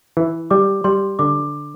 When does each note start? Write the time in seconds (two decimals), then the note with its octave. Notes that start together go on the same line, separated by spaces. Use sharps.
0.17 E3
0.50 G3 D6
0.84 G3 C6
1.19 D3 D6